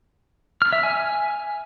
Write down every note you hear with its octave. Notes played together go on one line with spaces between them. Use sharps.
F6
E5
G#5